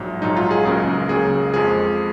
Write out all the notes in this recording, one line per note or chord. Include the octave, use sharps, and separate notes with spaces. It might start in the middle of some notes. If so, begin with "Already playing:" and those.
Already playing: A#1 G#2 F#3
A#1 G#2 F#3 D#4
F4
G#4
C#2 C#3 F#3 A#3 G#4
C#2 C#3 F#3 A#3 G#4
F2 F3 G#3 G#4